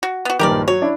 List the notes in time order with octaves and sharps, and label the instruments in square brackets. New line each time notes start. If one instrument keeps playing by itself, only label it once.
[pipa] F#4
B3 F#4
[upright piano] A#1 G2 D#3 [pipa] G4 A#4 D5
[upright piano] F#3 [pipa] C#5
[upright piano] D4 E4